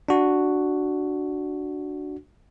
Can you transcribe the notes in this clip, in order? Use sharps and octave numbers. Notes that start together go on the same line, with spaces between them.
D4 F#4